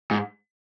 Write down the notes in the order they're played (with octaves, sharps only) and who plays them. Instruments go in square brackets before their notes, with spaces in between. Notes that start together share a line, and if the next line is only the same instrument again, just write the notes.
[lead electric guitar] G#2